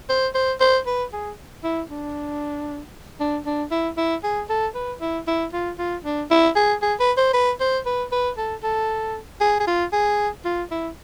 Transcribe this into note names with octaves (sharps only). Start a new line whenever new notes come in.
C5
C5
C5
B4
G#4
E4
D4
D4
D4
E4
E4
G#4
A4
B4
E4
E4
F4
F4
D4
E4
G#4
G#4
B4
C5
B4
C5
B4
B4
A4
A4
G#4
G#4
F4
G#4
F4
E4